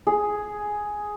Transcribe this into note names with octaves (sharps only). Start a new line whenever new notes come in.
G#4